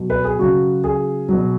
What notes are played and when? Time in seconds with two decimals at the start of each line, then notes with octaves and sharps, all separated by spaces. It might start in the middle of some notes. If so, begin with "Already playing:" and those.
Already playing: B2 F#3
0.10 B4
0.24 G#4
0.39 C#3 F#3 F#4
0.84 G#4
1.29 B2 F#3